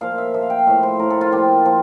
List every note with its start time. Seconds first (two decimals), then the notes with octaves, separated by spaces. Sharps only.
0.01 A#2 F3 F5
0.18 E5
0.34 A#2 F3 E5
0.42 F5
0.50 G5
0.59 F5
0.67 A2 F3 E5
0.83 C5
0.99 A2 F3 A#4
1.10 A4
1.21 F4
1.32 A#2 F3 G4
1.65 F3